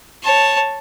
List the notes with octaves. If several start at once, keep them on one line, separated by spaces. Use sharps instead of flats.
C#5 A5